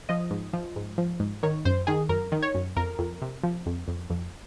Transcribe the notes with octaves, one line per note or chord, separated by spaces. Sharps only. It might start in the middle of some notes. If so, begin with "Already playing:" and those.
F3 D#5
G#2
F3
G#2
F3
G#2
D#3 C#5
F#2 C5
D#3 G#4
F#2 A#4
D#3
C#5
F#2
F2 A#4
F2
C3
F3
F2
F2
F2